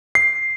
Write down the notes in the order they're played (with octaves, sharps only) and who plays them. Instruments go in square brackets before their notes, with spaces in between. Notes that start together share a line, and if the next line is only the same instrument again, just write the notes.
[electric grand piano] C7